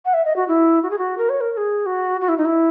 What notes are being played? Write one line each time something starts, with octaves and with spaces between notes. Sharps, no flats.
F#5
E5
D#5
F#4
E4
F#4
G#4
F#4
A#4
C#5
A#4
A#4
G#4
F#4
F#4
E4
D#4
E4